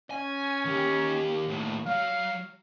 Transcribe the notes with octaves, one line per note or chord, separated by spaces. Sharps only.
C#4 G#5
D#3 G4
D#2 A2
F#3 F5